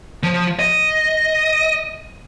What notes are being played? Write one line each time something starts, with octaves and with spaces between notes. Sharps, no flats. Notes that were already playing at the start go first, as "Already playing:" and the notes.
F3
D#5